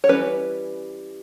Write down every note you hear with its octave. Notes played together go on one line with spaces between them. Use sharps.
C#5
E3 G3 C#4 B4